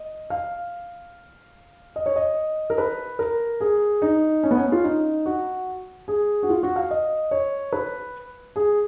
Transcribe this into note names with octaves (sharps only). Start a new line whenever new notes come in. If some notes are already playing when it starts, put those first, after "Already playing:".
Already playing: D#5
F5
D#5
C#5
D#5
A#4
B4
A#4
G#4
D#4
C#4
B3
C#4
F4
D#4
F#4
G#4
F#4
F4
F#4
F5
D#5
C#5
B4
G#4